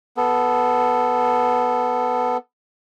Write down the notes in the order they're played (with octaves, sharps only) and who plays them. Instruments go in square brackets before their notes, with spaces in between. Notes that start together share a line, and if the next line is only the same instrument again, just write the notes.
[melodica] B3 A4